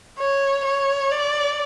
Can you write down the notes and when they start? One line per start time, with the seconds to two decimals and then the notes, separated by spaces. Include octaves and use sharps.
0.19 C#5
0.65 C#5
1.12 D5